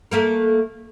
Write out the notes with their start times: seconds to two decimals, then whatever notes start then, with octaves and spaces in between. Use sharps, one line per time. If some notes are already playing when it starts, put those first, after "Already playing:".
0.11 A3 A#3 A#4